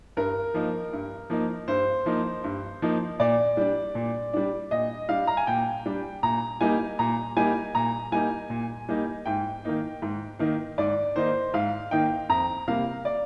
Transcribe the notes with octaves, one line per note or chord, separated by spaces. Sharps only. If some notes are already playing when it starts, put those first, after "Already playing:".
G2 A#4
F3 A#3 D#4
G2
F3 A#3 D#4
G2 C5
F3 A#3 D#4
G2
F3 A#3 D#4
A#2 D5
G3 D4
A#2
G3 D4
A#2 D#5
G3 D4 F5
A#5
G#5
A#2 G5
G3 D4
A#2 A#5
G3 A#3 D#4 G#5
A#2 A#5
G3 A#3 D#4 G#5
A#2 A#5
G3 A#3 D#4 G#5
A#2
G3 A#3 D#4
G#2 G5
D#3 A#3 D#4
G#2
D#3 A#3 D#4
G#2 D5
D#3 A#3 D#4 C5
G#2 F5
D#3 A#3 D#4 G5
F2 A#5
C3 G3 A#3 F5
D5